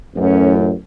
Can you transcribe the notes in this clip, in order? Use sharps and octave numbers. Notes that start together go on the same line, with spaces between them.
A1 F#2 C#4